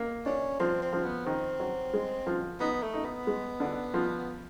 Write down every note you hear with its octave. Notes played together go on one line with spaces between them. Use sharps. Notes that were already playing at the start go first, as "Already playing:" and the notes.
Already playing: A#3
C#4 D4
F3 C4
C4
F3
B3
D#3 C4
F#3
G#3
F3
B3 D#4
A3
D#4
B3
G#3
D3
F3